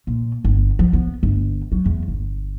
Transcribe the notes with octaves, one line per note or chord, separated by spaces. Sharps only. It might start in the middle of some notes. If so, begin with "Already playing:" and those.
A#2
G1
F3
B3
G1
F#3
E2
G1